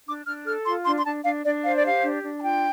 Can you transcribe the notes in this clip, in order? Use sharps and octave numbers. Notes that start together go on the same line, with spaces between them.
D4 D6
D4 F6
A4 F6
F4 C6
D4 C6
C6
D4 A5
D4 F5
D4 D5
C5 F5
D5
G4 F5
D4
D4
A5
F4 G5